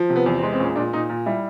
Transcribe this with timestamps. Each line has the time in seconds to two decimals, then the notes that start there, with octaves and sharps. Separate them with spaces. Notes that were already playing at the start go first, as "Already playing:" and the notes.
Already playing: F3
0.10 C3
0.16 B3
0.26 E2
0.38 C4
0.43 G#3
0.53 C4
0.59 A#2 C#4
0.76 A#2 D4
0.93 A#2 D#4
1.09 A#2
1.26 G3 E4